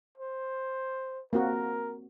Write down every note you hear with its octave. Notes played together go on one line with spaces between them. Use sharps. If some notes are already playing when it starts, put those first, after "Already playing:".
C5
A#3 C4 F#4 A#4